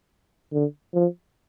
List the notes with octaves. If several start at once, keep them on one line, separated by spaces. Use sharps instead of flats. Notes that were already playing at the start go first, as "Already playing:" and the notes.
D3
F3